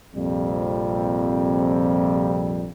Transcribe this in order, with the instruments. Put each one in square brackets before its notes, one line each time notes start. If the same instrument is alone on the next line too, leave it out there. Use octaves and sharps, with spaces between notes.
[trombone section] A#1 F2 C3 G3